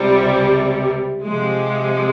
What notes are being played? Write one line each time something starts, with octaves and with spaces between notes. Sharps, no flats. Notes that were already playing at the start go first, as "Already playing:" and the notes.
Already playing: C#2 C3 G3
C3 F3 G#3